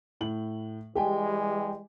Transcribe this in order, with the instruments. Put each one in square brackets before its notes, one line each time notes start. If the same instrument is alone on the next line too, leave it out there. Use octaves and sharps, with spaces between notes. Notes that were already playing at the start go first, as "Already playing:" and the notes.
[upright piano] A2 F#7
[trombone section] E3 G3 G#3 [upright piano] G4 G5 G#5